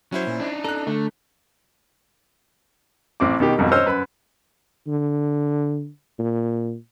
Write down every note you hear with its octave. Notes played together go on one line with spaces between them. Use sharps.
F#3 C#4 E4 C5
A#2
D4 D#4
A4 A#5 F#6
D3 A3
A1 C4 D6
B2 D#3 G4
G#1 F2 B2
C5 C#5 D#5 E6 F6
F#2 B4
D3
A#2